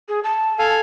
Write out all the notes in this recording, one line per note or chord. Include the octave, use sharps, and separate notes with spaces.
G#4
A5
A4 F5 G#5